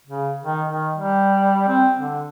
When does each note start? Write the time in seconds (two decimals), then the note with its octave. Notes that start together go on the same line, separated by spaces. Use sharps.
0.07 C#3
0.44 D#3
0.68 D#3
0.94 G3
1.68 C4
1.99 D3